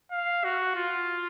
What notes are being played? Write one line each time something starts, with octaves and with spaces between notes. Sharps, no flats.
F5
F#4
F4